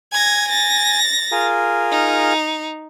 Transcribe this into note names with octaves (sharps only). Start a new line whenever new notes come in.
G#5 G#6 A#6
A6 A#6
F4 G#4 A#4
D#4